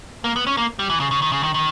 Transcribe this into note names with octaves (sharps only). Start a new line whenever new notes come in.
A#3
B3
C#4
A#3
G3
E3
C#3
C#3
D#3
C#3
D#3
D#3